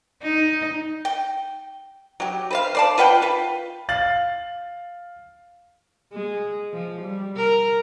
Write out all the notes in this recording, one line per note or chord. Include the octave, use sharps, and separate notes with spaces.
D#4
G5
F#3 G4
B4 C5 F5
C5 D5 A5
F4 B4 F#5 G5
F4 B4
F5 A6 F#7
G#3
F3
G3
A#4